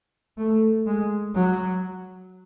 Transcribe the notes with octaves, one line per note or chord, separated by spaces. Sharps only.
A3
G#3
F#3